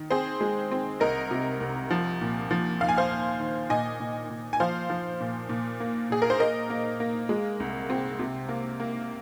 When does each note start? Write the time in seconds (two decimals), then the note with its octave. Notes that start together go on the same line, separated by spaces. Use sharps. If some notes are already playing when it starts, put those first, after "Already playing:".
Already playing: D#3
0.10 C4 G#4 C5
0.41 G#3
0.72 C4
1.00 C2 A#4 D#5
1.31 C3
1.60 C2
1.91 F3
2.21 A#2
2.51 F3
2.80 D#2 F5
2.89 G#5
2.97 C5 F5
3.11 D#2
3.40 D#3
3.70 A#2 D#5 G#5
4.00 A#2
4.30 A#2
4.53 G#5
4.60 F3 C5 F5
4.90 F3
5.20 A#2
5.49 A#2
5.80 A#3
6.10 A#2 G#4
6.22 A#4
6.30 C5
6.40 A#3 A#4 D#5
6.70 A#3
7.00 A#3
7.29 G#3
7.60 C2
7.90 C4
8.19 C3
8.49 A#3
8.80 A#3